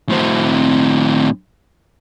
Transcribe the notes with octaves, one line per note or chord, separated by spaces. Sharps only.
A2 C4